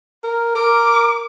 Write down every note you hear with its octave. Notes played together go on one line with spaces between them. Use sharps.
A#4
A#4 D6